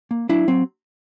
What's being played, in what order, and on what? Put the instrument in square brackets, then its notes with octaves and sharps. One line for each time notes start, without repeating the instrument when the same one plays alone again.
[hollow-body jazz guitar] A#3
F#3 D4 E4
F#3 C4